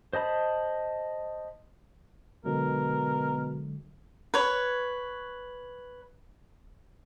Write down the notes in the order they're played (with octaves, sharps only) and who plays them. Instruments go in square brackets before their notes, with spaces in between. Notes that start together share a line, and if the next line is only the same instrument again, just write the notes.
[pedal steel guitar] C5 D#5 A5 B5
[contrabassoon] B2 [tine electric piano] D3 F#3 G#3 [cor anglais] A#4
[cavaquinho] B4 C#5